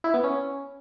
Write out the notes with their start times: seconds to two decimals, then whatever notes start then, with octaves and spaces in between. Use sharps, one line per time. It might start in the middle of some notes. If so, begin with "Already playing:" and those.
0.04 E4
0.14 B3
0.24 C#4